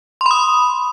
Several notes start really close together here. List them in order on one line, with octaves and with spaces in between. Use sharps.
C6 B5 D#6